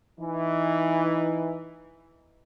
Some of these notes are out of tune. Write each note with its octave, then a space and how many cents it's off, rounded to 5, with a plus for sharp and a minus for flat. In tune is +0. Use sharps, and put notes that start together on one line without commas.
E3 +0 D#4 +0